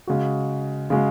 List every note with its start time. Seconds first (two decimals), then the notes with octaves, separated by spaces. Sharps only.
0.07 C#3 G#3 F#4
0.90 C#3 G#3 F#4